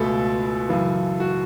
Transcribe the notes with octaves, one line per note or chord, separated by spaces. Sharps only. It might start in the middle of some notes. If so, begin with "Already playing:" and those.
Already playing: C#2 B2 A3 A4
F#2 C#3 E3
F#4